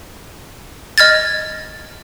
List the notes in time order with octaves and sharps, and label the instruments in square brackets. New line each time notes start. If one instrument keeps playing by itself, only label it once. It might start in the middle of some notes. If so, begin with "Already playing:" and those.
[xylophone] D#5 F6 G#6 A6